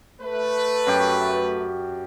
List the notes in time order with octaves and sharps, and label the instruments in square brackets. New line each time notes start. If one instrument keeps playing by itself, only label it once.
[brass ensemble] A3 B4
[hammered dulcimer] F#2 G4